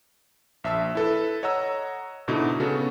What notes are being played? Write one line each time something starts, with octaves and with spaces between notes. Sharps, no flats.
A#1 E5 A5 E6
E4 A4 B4
C#5 D#5 F#5 A#5 E6
G#2 B2 D3 D#4 E4 F#4
C#3 B3 F#4 A4